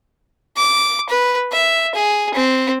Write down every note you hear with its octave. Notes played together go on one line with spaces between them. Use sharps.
D6
B4
E5
G#4
C4